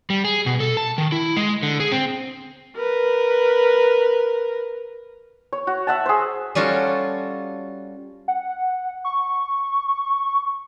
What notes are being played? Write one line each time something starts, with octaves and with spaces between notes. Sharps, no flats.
G3
G#4
B2
A4
A5
D#3
E4
G#3
D3
G#4
C4
A#4 B4
C#5
F#4
E5 F#5 A5
G#4 C5
G3 C#4 F4 F#4 A4
F#5
C#6